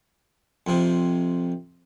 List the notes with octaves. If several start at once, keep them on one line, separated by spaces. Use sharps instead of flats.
F2 C3